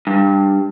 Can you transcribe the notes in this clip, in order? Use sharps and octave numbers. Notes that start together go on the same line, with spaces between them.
G2